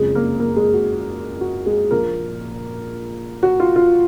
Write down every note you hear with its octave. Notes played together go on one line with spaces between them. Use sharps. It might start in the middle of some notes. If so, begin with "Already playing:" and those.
Already playing: F#1 F2 C#3 G#3 G#4
A#3 A#4
A#3 A#4
G#3 G#4
F#4
F#4
G#3 G#4
A#1 A#2 F3 A#3 A#4
F#4
F4
F4